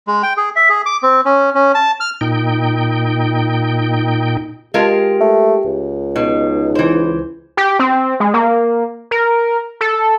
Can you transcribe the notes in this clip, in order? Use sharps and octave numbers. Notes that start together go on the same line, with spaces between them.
G#3
G5
G#4
E5
G#4
D6
C4
C#4
C#4
A5
F6
A#2 D#4 G5
G#3 F4 G4 A#4
A3
C#2
B2 D#4
E3 C5
G4
C4
G#3
A#3
A#4
A4